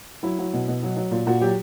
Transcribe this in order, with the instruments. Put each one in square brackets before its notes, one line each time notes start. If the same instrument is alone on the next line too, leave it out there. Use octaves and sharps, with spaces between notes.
[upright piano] F#3 E4
F#3
B2
B2
F#3
F#3
A#2
A#2 F#4
F#3 G4